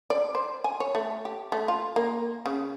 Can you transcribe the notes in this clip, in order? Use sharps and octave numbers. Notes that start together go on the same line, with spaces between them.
D5
C5
G#5
C#5
A3
G4
A3
F4
A#3
C#3